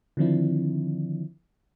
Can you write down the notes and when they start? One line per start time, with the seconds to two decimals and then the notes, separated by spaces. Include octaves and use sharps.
0.17 D3 D#3 F3 C4 D4 E4